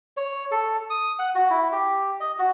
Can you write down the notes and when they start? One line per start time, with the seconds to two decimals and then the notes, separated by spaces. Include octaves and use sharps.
0.17 C#5
0.51 A4
0.90 D#6
1.19 F#5
1.35 F#4
1.50 E4
1.72 G4
2.20 D#5
2.39 F#4